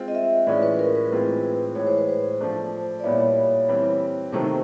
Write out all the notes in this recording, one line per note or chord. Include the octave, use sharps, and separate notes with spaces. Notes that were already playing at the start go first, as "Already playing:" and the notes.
Already playing: G#3 C4 F4
D#5
E5
A2 E3 G#3 C#4 F4 D5
B4
A#4
B4
A2 E3 G#3 C4 F4
A2 E3 G#3 C#5
C5
B4
C5
F3 A3 D4
D5
A#2 G3 B3 E4 C#5
E3 G3 C4
C3 D#3 F#3 A3 C5